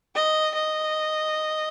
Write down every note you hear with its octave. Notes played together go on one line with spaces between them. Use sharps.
D#5
D#5